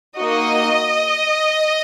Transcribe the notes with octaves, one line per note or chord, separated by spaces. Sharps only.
A#3 D#4 F#4 D#5